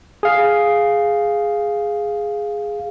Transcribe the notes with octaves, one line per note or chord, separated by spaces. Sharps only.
G#4 F5